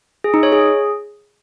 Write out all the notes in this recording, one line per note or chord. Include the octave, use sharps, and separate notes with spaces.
G#4
D#4
C#5
G#4